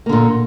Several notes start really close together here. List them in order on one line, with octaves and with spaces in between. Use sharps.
A#3 D3 A#2